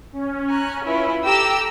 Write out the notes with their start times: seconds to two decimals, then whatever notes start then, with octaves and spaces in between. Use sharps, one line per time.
0.13 C#4
0.48 G#5 A#5 F#6
0.84 E4 F4 B4
1.25 G4 A4 A#5 E6